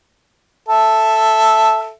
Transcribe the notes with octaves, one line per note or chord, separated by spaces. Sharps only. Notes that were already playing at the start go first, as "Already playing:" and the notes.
A4 E5